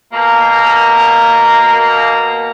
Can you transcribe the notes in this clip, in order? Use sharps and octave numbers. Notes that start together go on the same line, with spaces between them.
B2 A#3 A#5